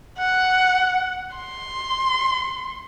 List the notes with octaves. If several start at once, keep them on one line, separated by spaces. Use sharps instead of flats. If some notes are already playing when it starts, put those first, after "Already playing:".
F#5
C6